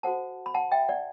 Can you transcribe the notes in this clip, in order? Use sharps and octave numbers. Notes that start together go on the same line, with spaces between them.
F#4 A4 C5 F#5 A5
B5
F#5 A5
E5 G5
D5 F#5